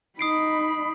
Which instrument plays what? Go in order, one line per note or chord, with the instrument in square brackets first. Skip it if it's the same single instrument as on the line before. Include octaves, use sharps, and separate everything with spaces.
[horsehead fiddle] D#4 B5 [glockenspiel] D#6 C7 D7